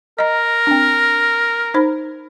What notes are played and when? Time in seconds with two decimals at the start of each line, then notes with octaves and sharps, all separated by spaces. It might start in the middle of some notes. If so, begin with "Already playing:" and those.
0.19 A#4 D#5 A#5
0.67 C4 D4
1.74 D#4 C5 B5